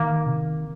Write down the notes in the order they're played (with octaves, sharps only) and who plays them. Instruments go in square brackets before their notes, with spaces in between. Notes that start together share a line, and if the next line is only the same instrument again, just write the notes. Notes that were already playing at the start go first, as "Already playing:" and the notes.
Already playing: [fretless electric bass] D#3 [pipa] A#3
[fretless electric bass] C3